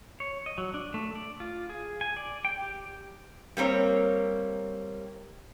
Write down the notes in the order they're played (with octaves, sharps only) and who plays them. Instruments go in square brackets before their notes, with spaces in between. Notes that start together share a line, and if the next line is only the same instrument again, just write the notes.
[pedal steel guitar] C#5
D#5
F#3
D4
A3
D5
F4
G#4
G#5
D5
G5
G4
[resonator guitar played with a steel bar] G3 A#3 C4 C#5